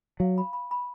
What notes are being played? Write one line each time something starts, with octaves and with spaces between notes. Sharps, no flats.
F#3 F5
B5
B5
B5